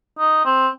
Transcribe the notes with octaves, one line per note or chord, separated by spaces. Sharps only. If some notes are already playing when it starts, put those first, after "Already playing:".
D#4
C4